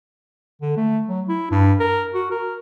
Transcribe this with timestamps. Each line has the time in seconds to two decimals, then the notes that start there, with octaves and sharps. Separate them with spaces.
0.62 D3
0.77 A3
1.09 F#3
1.29 E4
1.51 G2
1.80 A#4
2.14 F#4
2.31 A#4